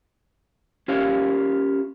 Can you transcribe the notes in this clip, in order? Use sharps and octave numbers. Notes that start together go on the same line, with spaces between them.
C#4 F4 G4 C#5 F5